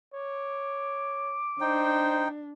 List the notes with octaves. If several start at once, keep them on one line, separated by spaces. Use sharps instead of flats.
C#5 D6
D4 D#4 C5 G5